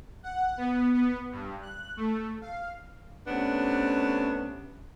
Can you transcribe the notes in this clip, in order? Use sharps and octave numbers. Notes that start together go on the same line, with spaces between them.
F#5
B3
B3
G2
F#6
A3
F5
C3 A3 B3 C#4 D4